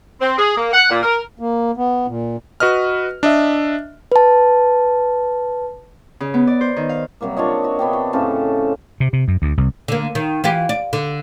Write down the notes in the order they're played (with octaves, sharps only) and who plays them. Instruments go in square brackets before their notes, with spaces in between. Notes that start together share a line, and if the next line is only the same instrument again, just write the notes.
[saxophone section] C4
G#4
A#3
F#5
A#2
A#4
[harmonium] A#3
B3
A#2
[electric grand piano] F#4 B4 D#5 F6
D4 D#5 E5
[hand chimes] B4 A5
[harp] C#3
B3
D5
C5
D#3
F5
[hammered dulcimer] C3 F#3 G3 A#3
D4 F4 C#5 D#5
F#4
C3 B3 D4 G5
F#4
A2 C#3 C4 A4
[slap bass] C3
C3
F#2
D2
C2
[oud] D3 A#3
D#3
E3 F4 G4
D5
D3